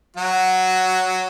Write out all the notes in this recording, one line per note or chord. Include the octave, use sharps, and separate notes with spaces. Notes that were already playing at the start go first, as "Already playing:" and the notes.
F#3 F#4